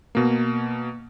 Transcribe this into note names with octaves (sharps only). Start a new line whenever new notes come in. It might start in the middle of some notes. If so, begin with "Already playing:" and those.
B2 A#3